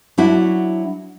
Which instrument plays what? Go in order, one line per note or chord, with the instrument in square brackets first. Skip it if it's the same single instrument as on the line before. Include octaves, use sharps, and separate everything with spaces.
[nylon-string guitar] F#3 D4 E4 F#4